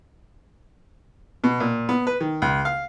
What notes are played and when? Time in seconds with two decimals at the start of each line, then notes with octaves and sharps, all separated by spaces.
1.44 B2
1.60 A#2
1.89 B3
2.07 B4
2.21 D#3
2.42 C#2
2.65 F5